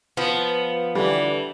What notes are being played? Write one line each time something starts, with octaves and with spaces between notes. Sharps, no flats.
F3 B3
D3 E3 G3